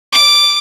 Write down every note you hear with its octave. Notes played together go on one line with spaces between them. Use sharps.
D6